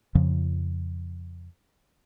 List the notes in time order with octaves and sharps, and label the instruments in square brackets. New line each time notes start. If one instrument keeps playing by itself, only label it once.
[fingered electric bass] F2 C#3 F3